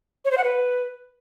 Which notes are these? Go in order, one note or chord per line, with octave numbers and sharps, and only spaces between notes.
C#5
C5
F#5
B4